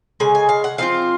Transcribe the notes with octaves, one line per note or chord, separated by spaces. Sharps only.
C#3 G#3 G#5
G#5
F5
F#5
F3 C4 F4 F5